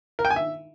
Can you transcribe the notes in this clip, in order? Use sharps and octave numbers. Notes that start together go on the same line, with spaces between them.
A#4
G5
G#5
E5